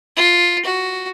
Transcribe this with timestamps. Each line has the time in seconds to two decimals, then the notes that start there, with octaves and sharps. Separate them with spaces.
0.16 F4
0.65 F#4